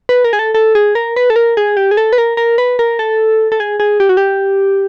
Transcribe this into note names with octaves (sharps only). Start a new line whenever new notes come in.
B4
A#4
G#4
A4
A4
G#4
A#4
B4
A4
A#4
G#4
G4
G#4
A4
B4
A#4
A#4
B4
A#4
A4
A4
G#4
G#4
G4
F#4
G4